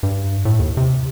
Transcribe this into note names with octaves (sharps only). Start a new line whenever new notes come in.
G2
A2
D#2
C3